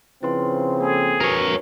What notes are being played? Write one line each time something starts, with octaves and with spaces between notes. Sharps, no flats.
C#3 F3 C4 E4 B4 C6
A#3 G#4 A4
D4 F#4 A#4 B4 C#5